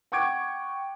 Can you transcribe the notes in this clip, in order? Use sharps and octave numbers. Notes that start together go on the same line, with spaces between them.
F#5 G5 C#6 D6 G#6 D7